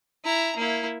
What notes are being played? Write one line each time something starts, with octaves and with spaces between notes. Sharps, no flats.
E4 A#5
A#3 E4